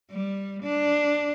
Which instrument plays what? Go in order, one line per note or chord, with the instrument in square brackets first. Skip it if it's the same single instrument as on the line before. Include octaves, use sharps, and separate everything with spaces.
[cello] G3
D4